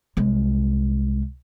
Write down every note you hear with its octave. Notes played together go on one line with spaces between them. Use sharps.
C2 G#3